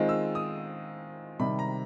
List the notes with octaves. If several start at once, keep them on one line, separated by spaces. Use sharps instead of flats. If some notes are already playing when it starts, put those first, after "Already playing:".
Already playing: D#3 G#3 C4 F4
E6
D#6
C3 D#3 G3 B5
A#5